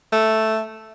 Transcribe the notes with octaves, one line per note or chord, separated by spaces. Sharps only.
A3